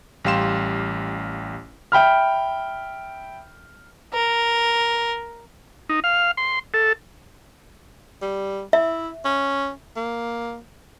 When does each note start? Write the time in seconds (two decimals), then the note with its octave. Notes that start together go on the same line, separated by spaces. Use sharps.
0.25 A1 G3 G4 F5 C6 E7
1.92 E5 G5 B5 F6
4.14 A#4
5.89 D#4
6.04 F5
6.37 C6
6.74 A4
8.22 G3
8.73 E4 E5
9.25 C#4
9.96 A#3